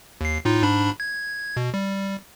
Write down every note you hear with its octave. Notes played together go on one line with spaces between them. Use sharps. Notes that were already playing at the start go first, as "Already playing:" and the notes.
D#2 C7
A2 D#4 F4
G#2 D4 B5
G#6
B2
G3